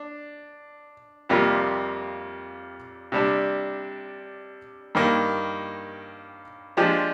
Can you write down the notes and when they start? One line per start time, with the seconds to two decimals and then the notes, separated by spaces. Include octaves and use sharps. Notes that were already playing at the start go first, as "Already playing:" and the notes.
Already playing: D4
1.29 F2 C3 G3 A#3 F4
3.12 C3 G3 D4
4.95 G2 D#3 A#3
6.77 F3 G#3 D4 G4